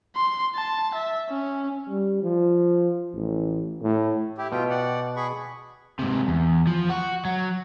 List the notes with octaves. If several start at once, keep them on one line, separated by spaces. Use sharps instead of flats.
C6
A5
E5
C#4
G3
F3
A1
A2
E4 G4
B2 F4 G5
D5 F#5
G#4 B5 C#6
G#2 C3
E2
F3
F#4
F#3